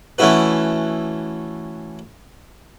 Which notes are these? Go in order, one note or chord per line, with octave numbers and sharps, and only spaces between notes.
E3 A3 C#4 E4 F#4 B4